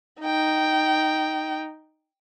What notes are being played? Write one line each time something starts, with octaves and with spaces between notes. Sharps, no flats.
D#4 G5